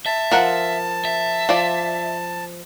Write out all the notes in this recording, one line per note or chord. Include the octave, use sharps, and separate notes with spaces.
E5 A5
F3 A#4 F#5
E5
F3 D5